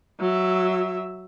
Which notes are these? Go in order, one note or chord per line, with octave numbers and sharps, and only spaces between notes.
F#3 E5